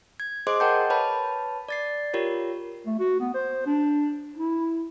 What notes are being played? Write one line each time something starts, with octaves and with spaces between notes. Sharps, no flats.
G#6
G#4 C5 D#5 C6 D6
A#4 D#5 F#5 G5 A5 G6
B4 C#5 A5 B5
D5 A6 C7
F4 G4 A#4 C#5
A3
F#4
B3
C5
D4
E4